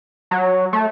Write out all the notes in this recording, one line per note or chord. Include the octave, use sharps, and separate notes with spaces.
F#3
A3